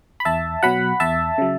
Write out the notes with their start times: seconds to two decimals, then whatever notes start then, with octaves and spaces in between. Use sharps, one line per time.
0.20 B5
0.25 E2 E5 A5
0.63 B2 F#3 F#5 B5
1.00 E2 E5 A5
1.38 C#3 F#3